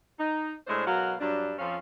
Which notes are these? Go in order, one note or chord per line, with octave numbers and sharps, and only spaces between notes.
D#4
A2 G#3 A3 D4 C5
B2 F#3 G#3 A#4 F5 F#5
G2 F#3 G3 D4
F2 F3 C#4 A4 F5